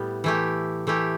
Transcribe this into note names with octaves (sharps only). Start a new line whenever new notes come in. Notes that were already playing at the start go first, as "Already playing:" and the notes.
Already playing: A2 G3 B3
E3 A3 E4 G4
E3 A3 E4 G4